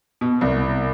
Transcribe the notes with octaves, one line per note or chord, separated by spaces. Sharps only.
B2
C2